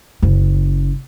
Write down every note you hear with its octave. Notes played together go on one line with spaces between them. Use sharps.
F#1 C#3